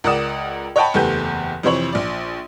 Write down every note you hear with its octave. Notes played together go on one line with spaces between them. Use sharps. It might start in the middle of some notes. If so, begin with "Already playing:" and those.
C#2 A#4 D5 F#5 D#6 E7
C#5 D#5 F#5 G5 A5 B5
F#1 E2 A3 G4 B4 G6
F2 C3 E3 C5 C#5 F#7
A#1 D5